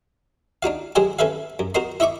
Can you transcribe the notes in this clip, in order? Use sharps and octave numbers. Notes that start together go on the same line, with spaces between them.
D4 D#4 F#4 F5
F#3 G#3 G4 C5 D#5 G#5
C#4 A4 B4 E5 F5
F#2
F#4 A#4 C5 D#5 C6
E4 D#5 E5 C#6 D6